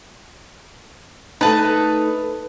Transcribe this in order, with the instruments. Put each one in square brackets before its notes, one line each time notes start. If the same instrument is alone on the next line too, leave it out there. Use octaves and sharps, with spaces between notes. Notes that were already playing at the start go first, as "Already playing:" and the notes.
[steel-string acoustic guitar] A3 D#4 [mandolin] B4 A5